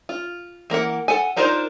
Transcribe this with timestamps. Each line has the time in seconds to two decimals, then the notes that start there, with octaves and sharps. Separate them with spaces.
0.09 F4
0.70 E3 A#3 A#4 F#5
1.08 A4 F#5 G#5
1.36 D4 D#4 F4 A#4 C5